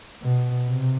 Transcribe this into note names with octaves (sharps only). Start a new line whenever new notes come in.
B2
C3